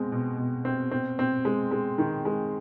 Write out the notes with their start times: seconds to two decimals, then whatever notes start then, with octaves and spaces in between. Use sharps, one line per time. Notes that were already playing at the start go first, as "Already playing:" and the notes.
Already playing: B2 G#3 C4
0.12 B2
0.38 B2
0.65 C4
0.91 C4
1.19 C4
1.45 G#3
1.71 G#3
1.98 D#3
2.25 G#3